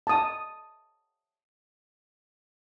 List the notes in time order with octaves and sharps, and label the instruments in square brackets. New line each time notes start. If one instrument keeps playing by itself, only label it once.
[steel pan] A5 D#6